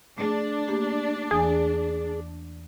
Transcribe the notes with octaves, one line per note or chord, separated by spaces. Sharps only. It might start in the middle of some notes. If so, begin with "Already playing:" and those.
A3 D4 G#4
A3 A#3 G4
E2 E3 G#4